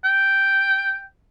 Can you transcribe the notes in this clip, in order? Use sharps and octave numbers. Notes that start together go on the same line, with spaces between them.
G5